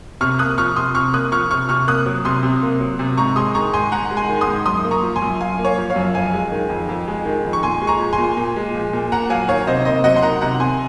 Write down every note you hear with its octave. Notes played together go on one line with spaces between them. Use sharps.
C3 C#6 F6
A#3 D#6 F#6
F3 C#6 F6
C3 C6 D#6
C3 C#6 F6
A#3 D#6 F#6
F3 C#6 F6
C3 C#6 F6
C3 C#6 F6
A#3 D#6 F#6
F#3
C3 C6 D#6
C3
A#3
F#3
C3
G#2 A#5 C#6
G#3 C6 D#6
D#3 A#5 C#6
G#2 G#5 C6
G#2 F#5 A#5
G#3
G#5 C6
D#3
C6 D#6
G#2
F#2 C6 D#6
A#3
A#5 C#6
F3
G#5 C6
F#2
F#2 F5 G#5
A#3
C#5 F5
F3
C#5 F5
F#2
F2 F5 G#5
G#3
D#3
F2
F2
G#3
D#3
F2
C#6
A#2 G#5 C6
G#3
A#5 C#6
F3
G#5 C6
A#2
A#2
G#3
F3
A#2
A#3 F#5 A#5
F#3 F5 G#5
D#3 C#5 F5
C3 C5 D#5
A#3 C5 D#5
F#3 D#5 F#5
C6
D#3 F#5 A#5
C3 F#5 A#5
C3 G#5 C6